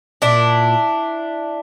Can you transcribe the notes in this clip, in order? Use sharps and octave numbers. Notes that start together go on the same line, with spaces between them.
A#2 D4 E4